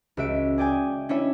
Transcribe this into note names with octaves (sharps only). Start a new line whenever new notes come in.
C#2 F#4 E5 D7
G#4 D5 G5 G#5
C#4 D4 E4 C#5 E5